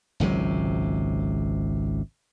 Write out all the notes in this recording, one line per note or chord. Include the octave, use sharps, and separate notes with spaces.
G#1 C#2 C3 F#3